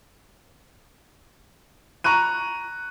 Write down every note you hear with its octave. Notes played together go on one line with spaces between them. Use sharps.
A#5 C#6 F#6 D#7